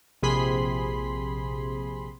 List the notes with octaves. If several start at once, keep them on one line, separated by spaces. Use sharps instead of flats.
A#1 C3 G#4 B5 C6